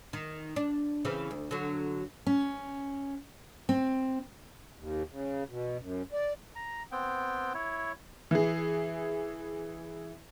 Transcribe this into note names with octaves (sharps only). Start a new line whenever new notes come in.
D#3
D4
C#3 E3 C4
D2
D3 F#3
C#4
C4
D#2
C#3
B2
F#2
D5
A#5
B3 C4 G5
E4 C#5
E3 G#4